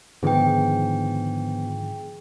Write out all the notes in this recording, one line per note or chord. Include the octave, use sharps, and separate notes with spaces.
G#2 D3 D#3 F3 B3 G#4 G5